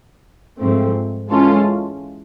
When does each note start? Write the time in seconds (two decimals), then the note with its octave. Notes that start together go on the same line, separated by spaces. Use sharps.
0.59 G#2 F3 A3 C4
1.30 E3 G#3 C#4 F4 A4